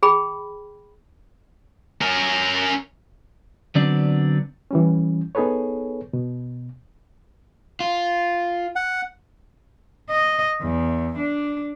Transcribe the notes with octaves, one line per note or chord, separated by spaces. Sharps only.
G#4 G5 B5
C#4 A#4
D3 F#3 B3 C4 D4 D5
E3 G3 C#4
B3 D#4 G#4 A4 B4 C#5
B2
F4
F#5
D#5
E2
D4